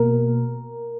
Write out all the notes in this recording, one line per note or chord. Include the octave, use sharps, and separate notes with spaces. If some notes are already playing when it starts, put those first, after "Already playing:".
Already playing: B2 A#3 A#4